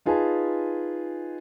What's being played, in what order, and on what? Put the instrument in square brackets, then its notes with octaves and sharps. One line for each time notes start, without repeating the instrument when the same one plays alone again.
[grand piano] D#4 F4 G#4 B4 G#5 A5